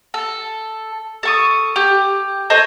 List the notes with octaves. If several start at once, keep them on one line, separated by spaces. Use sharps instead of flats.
A4
A4 C#6 D#6
G4
A4 C5 C#5 D#5